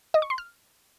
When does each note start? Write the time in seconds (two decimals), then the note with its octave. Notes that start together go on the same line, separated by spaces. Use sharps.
0.14 D#5
0.22 C#6
0.30 C6
0.38 F6